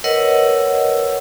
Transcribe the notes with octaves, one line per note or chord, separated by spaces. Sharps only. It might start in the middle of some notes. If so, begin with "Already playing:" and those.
A#4 B4 C#5 D#5 F#5 E6